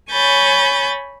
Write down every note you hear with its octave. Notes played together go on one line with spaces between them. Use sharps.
C#5 G#5 B5 G6 A6